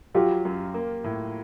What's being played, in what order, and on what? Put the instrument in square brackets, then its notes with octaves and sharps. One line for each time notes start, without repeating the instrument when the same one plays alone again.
[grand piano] F#3 [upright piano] F4 G4
[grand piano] F#2
A#3
A2